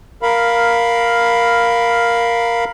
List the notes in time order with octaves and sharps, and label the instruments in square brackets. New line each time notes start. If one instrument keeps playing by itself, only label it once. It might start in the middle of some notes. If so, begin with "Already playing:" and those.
[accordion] A#4 F5 B5